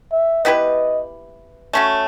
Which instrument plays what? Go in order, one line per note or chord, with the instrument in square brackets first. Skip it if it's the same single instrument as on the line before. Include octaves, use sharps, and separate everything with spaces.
[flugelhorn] E5
[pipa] B3 E4 G4 B4 [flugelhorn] D#5
[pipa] A3 C#4 F#4